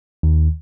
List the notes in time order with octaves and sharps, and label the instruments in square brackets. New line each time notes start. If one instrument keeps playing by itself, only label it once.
[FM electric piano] D#2